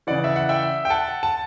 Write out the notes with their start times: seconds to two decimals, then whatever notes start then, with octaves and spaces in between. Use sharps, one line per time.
0.07 C#3 E3 D5 F#5
0.24 E5
0.36 F#5
0.49 E5 G5
0.85 G5
0.90 F#5 A5
1.23 A5